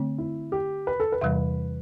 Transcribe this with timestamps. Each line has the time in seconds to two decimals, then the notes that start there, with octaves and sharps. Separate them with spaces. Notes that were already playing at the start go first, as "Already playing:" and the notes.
Already playing: D3 A3 C4
0.18 E4
0.52 G4
0.87 B4
1.00 A4
1.12 B4
1.21 E2 C3 E3 G3